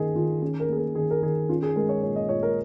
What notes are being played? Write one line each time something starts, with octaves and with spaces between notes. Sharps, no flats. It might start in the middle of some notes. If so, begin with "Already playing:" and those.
Already playing: D#3 A#3 C#4 G#4 A#4 D#5
D#3 F4
C#4 G#4
A#4
A#3 G#4
A#4
D#3 G#4
A#4
D#3 G#4
C#4 F4
G#4
G#3 A#4
C#5
A#2 C#5
D#5
A#2 C#5
A#4